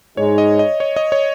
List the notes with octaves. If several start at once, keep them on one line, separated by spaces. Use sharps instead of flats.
G#2 G#3 D#4 C#5
D#5
D#5
C#5
D#5
C#5